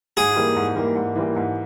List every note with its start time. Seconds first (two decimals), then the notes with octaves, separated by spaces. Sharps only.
0.17 G#2 G#4
0.36 E3 G3 A#3
0.56 G#2
0.76 E3 G3 A#3
0.96 G#2
1.16 E3 G3 A#3
1.36 G#2